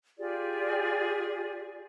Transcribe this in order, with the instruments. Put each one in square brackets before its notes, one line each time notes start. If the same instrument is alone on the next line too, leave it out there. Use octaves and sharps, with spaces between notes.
[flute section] F4 G4 G#4 D5